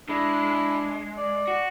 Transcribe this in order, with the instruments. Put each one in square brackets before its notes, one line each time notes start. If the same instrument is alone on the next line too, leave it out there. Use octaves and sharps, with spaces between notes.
[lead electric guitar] G#3 [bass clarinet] D4 [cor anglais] E4
[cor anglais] D5
[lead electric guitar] F#4